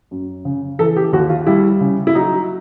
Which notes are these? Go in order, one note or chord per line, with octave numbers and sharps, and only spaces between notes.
F#2
C#3
E3 A4
G4
D#2 F#4
F4
G3 E4
C#3
E4
F#3 D#4